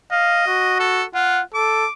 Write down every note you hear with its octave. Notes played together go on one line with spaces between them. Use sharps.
D#5 F5
F#4
A4
F4 F#5
A4 D6